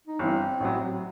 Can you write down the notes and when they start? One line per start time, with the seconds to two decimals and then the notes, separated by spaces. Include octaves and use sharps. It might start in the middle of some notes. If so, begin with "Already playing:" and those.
0.07 D#4
0.19 G1 G2 E3 C4
0.60 A1 A2 F#3